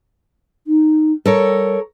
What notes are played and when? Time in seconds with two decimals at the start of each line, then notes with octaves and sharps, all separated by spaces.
0.67 D#4
1.26 G3 A4 A#4 C#5